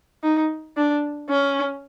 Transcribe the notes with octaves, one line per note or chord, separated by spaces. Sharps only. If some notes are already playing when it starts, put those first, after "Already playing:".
D#4
D4
C#4